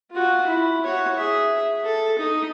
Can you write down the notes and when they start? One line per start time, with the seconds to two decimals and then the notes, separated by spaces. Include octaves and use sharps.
0.11 F4 F#4
0.47 E4
0.84 F#4 C#5
1.18 G#4 E5
1.84 A4
2.19 D#4